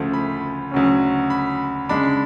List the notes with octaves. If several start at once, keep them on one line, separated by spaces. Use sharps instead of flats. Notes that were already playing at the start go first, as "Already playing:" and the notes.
Already playing: D2 C#3 F3 A3
B5
D2 C#3 F#3 C#4
B5
C#3 G#3 D4 B5